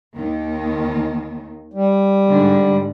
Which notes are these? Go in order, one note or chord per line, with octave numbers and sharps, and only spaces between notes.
D#2 D#3
G3
G#2 D3